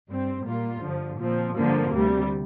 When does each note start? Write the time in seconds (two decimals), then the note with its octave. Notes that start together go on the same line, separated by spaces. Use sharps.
0.08 G2 G3 C4
0.44 A#2 G3 A#3 F4
0.81 G2 D3 F3
1.19 A#2 F3 C4
1.55 G2 D3 F3 A#3
1.92 D2 C3 G3